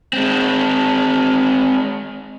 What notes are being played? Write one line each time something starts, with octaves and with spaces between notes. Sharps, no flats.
G#3 C4